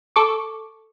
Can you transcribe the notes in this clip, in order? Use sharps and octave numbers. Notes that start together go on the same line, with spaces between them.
A4 C#6 D6